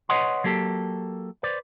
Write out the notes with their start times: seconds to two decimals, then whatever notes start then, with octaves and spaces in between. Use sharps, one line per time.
0.09 B4 C#5 D#5 F#5 C6
0.44 F#3 A#3 G4 A4
1.43 B4 C5 D5